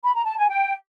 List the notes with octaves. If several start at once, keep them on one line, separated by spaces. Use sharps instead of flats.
B5
A#5
A5
G#5
G5